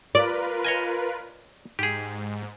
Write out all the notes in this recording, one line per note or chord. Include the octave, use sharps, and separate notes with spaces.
F4 A#4 B4 D5
C#5 D#5 G#5
G#2 G4 G#4